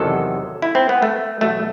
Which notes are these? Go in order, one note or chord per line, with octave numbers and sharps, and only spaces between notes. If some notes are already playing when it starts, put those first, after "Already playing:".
Already playing: E2 C3 D#3 F#3 A4
E4
C4
B3
A3
E2 B2 F#3 A3